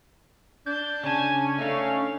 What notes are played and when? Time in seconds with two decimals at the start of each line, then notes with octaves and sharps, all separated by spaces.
0.66 D4 G6
1.03 C#3 C#4 G#5 A5
1.59 A3 D4 D#4 F5